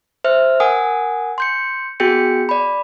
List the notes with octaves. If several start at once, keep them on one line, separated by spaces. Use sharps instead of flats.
C5 E5 F6
A#4 F#5 G#5 D#6
C6 G6 C#7
B3 F#4 G#4 G5 G6 C#7
D5 B5